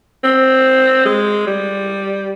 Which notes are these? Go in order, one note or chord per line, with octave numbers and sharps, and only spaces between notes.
C4
G#3
G3